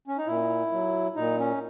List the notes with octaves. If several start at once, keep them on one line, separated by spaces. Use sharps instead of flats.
C#4
D#4
A#2 E4
F#3
A#2 D#4
C#4